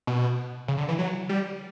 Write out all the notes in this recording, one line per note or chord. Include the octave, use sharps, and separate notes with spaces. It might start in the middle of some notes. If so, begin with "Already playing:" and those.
B2
C#3
D3
E3
F#3
G3